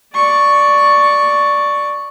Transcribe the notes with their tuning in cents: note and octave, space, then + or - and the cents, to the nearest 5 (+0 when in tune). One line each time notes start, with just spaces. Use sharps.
D5 +0 C#6 +0